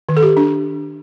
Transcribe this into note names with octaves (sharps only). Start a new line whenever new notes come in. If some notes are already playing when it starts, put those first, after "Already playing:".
D#3
A4
G4
D4